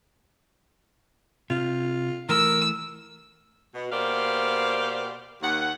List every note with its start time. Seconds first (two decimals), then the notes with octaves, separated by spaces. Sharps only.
1.50 C3 F4
2.29 E3 A3 A#4 E6
3.74 B2
3.91 B2 A#3 G4 C5 D5 F5
5.42 D#2 F#5